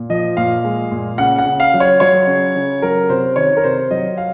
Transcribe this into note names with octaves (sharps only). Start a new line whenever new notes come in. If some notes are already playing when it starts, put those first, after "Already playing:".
Already playing: A#2
F3 D#5
A#2 F5
G#3
A#2
C#3 F#5
F#5
C#3
F5
F#3
C#5
F#3 C#5
C#3
C#3
F#3 A#4
C3 C5
D#3 C#5
A#4
C3 C5
F#3 D#5
F5